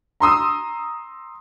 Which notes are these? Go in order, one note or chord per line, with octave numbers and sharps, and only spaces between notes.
A#5 C6 D#6 E6